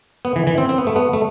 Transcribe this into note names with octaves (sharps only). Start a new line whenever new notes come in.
B3
E3
E3
C4
C4
B3
A3
B3
A3